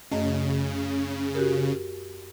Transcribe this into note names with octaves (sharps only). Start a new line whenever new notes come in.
F#2 C#3 A3 D#5
F#4 G4 A#4